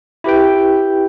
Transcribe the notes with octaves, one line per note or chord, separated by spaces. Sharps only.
E4 G4 B4 G5